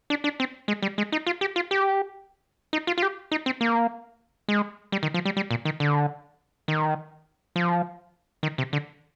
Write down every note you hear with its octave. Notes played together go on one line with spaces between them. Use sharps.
D4
D4
C4
G#3
G3
G#3
D#4
F4
G4
F4
G4
D#4
F4
F4
G4
D#4
C4
A#3
G#3
G3
D#3
F3
G3
G3
A#2
D#3
D3
D#3
F3
D#3
C3
D3